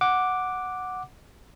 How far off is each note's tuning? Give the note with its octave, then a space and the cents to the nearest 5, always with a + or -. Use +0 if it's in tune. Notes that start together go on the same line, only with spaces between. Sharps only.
F#5 -5 D6 +0